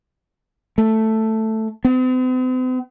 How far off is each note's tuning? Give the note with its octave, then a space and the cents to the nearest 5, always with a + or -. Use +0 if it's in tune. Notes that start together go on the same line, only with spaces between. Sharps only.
A3 +5
C4 -45